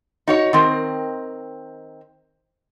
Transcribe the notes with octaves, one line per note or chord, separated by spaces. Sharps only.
D#4 F#4 C#5
D#3 C4 A#4